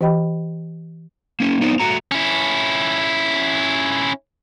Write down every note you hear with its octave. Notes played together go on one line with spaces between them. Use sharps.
E3 G4 D#5 G5 B5
A#3 C#4
B3 C4 D#4
A3 F#4 A#5
C#4 E4